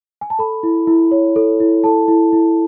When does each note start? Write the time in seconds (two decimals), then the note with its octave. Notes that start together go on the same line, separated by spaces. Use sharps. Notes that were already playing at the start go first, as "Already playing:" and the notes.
0.21 G#5
0.30 A5
0.39 A4 B5
0.63 E4
0.87 E4
1.11 C#5
1.36 A4
1.60 E4
1.84 A4 A5
2.08 E4
2.33 E4